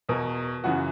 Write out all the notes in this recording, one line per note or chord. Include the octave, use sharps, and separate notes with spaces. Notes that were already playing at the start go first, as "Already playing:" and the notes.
E2 B2 A#4
F#2 C#3 E3 F#4